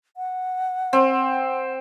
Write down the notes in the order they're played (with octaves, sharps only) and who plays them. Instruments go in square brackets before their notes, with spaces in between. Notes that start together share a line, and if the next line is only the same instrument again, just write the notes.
[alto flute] F#5
[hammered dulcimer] C4